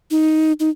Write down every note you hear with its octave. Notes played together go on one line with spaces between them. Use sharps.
D#4
D#4